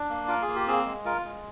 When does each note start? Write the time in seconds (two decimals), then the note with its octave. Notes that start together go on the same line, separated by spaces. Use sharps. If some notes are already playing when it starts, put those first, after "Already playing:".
Already playing: D4
0.09 A#3
0.28 F4 A#4
0.42 G#4
0.48 A#3
0.55 G4
0.67 C4 G#4
0.86 G#3
1.05 F4 A#4
1.25 G#3